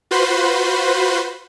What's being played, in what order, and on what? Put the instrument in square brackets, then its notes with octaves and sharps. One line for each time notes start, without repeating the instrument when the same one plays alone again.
[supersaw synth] F4 F#4 B4 C5 B5 C6